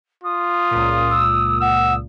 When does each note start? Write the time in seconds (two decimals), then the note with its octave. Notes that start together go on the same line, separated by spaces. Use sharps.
0.24 F4 D#6
0.71 C#2 A#2
1.10 E6
1.61 F#5 E6